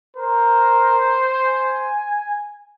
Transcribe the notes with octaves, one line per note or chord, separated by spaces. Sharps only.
A#4 C5
G#5